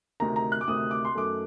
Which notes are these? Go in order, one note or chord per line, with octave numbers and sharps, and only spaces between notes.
D2 C3 D#3 A#5
A#5
F#6
D6
D2 C3 D#3 D#6
D6
C6
F#2 D#3 A3 D6